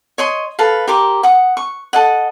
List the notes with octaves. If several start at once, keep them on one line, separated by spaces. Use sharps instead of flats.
C#5 D#5 C6
A4 B4 F5
G4 A#4 C5 D6
F#5 D#6
C#6
A4 D#5 F#5